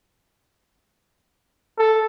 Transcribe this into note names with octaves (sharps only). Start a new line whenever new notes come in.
A4